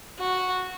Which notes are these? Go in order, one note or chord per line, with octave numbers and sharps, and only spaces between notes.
F#4